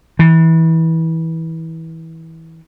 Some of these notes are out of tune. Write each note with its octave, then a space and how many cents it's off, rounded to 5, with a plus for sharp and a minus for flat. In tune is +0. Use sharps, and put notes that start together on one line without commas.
E3 -25